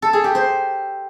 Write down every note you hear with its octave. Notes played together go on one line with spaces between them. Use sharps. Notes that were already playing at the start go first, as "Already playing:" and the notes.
A4
G#4
G4
C5